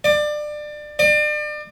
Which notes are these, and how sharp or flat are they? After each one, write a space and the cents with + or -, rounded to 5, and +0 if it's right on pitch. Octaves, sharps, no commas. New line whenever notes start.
D5 +25
D5 +35